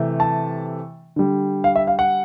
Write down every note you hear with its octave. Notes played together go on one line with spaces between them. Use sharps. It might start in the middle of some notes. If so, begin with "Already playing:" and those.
Already playing: C3 E3 A3
A5
D3 G3
F5
E5
F5
F#5